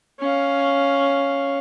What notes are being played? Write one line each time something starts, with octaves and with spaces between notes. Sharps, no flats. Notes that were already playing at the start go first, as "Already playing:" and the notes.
C#4 F5